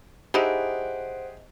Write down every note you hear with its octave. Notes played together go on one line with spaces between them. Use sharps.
D#4 E4 G4 G#4 C5 F#5 D7